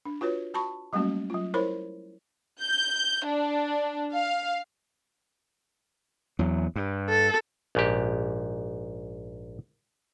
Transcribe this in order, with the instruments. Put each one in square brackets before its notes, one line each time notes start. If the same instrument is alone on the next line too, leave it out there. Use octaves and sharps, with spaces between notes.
[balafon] D4
F4 F#4 B4 C#5
F#4 A5 B5 C#6
F#3 G3 A3 A#3 C#4 F#4
F#3 F4
E4 A#4 C5 C#5 B5
[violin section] G6
D4
F5
[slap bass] E2 F#3
G2
[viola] A4
[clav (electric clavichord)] A#1 G#2 G4